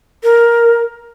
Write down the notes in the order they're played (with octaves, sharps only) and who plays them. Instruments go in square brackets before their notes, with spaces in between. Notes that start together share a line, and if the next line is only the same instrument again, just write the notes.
[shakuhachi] A#4